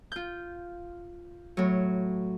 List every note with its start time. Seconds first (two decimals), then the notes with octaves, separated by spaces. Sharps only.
0.12 F4 G6
1.57 A2 F#3